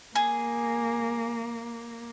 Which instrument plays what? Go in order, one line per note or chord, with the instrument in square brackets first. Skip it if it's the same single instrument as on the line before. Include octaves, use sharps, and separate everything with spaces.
[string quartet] A#3 [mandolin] G#4